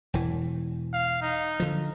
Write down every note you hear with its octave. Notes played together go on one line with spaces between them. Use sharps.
E1 E3
F5
D#4
D3 F3